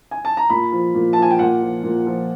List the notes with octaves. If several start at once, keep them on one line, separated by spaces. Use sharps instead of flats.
G#5
A5
A#5
A#2 B5
F3
A#2
A5
F3
G#5
G5
A#2 F#5
F3
A#2
F3